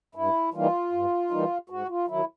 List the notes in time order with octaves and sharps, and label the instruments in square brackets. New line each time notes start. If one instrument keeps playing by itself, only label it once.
[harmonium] G2 E4
E3 G3 A#3 D#4 F4
G2
E3 G3 A#3 D#4
G#2 F#4
F4
D#3 F#3 E4